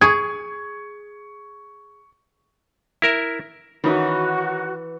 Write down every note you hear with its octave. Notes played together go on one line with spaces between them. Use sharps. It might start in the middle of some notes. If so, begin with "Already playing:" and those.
G#4 C#6 G#6
E4 A#4 E5
D#3 E3 C#4 D#4 F#4